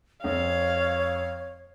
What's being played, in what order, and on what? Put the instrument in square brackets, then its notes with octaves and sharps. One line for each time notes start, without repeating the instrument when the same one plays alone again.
[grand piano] F2 [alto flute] C#5 [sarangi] F5